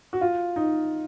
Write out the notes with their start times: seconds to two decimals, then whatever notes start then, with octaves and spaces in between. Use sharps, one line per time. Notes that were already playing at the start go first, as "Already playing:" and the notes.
0.13 F#4
0.21 F4
0.56 D#4